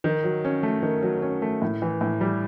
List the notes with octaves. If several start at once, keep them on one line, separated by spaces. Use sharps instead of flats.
D#3
F#3
C#4
A3
D#3
F#3
C#4
A3
A2
E3
A2
G3